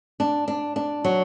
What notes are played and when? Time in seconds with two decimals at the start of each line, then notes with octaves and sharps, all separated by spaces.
0.20 D4
0.48 D4
0.76 D4
1.04 F#3